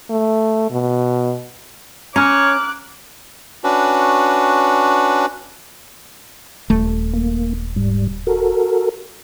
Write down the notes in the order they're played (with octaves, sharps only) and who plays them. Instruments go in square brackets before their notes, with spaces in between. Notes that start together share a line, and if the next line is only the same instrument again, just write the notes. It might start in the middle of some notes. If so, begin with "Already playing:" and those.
[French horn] A3
B2
[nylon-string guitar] C#4 [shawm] C#5 [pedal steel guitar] A#5 F6 [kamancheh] D6 F#6
[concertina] C#4 D4 F#4 B4
[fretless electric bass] D#1 A3
[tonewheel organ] A#3
G#2 G3
F#4 A4 A#4